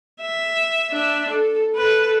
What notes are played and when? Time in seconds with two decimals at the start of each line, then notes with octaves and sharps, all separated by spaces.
0.20 E5
0.92 D4 E5
1.30 A4
1.76 A4 B4